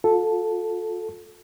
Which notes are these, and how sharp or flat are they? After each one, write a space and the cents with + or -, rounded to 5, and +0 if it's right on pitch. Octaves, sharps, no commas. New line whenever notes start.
F4 +40 A4 -5